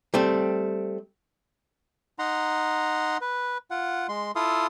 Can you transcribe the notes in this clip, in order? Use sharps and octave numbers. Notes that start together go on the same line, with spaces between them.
G3 A3 C4
D#4 F#5 A#5 C6
B4
F4 F#5
G#3 C6
E4 F4 A4 F5 C6 D#6